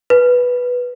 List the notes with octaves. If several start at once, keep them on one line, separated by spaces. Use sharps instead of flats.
B4